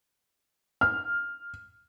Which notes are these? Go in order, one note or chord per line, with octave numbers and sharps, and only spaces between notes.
F6